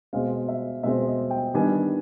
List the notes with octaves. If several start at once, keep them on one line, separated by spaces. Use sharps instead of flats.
B2 G#3 C4 F5
E5
B2 G#3 C4 E5
D#5
G5
D#3 G3 B3 D4 G#5